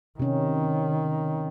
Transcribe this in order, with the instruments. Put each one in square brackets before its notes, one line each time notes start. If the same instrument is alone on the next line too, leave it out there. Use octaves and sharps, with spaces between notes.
[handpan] C3 C#4 [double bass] D#3